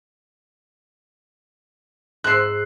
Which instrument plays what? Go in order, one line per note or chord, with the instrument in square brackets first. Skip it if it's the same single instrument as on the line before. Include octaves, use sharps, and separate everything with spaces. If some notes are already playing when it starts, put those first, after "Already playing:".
[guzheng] G#2 E5 [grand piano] F#6 C7